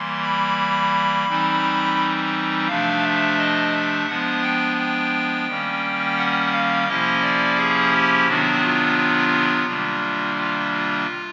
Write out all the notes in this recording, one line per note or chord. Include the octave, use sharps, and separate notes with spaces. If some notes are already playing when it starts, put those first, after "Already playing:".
Already playing: E3 G3 A#3 C6
B5
E3 G3 C4 D#4
C3 F3 A3 D4 F5
E5
D#5
E5
F3 G#3 B3 D4 F#5
G5
G5
D#3 G3 A#3 C#4
F#5
F5
C3 F3 A#3 C#4 E4 D#5
D5
G#4
G4
C3 D#3 F#3 B3 D4 F#4
F4
C3 D#3 G3 A#3 D4
F4
F4